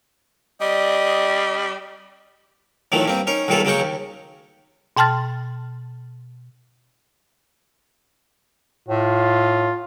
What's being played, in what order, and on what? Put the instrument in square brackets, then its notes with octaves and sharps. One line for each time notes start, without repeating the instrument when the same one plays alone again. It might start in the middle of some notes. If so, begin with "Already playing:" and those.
[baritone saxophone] G3 [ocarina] D5 [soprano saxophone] D#5
[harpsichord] D#2 A#2 D#3 E3 F#3 A3
G2 A#3 C4
C#4 D#4 A#4
B1 G2 A#2 D#3 G#4 A4
C#3 F#3 G#3 A#3 G5 C#6
D#2
[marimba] B2 G5 A5 C6 F6 A6
[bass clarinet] A2 [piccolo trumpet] F4